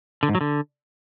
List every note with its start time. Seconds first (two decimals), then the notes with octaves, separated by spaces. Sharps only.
0.23 D3
0.29 G#2
0.35 F#3
0.41 D3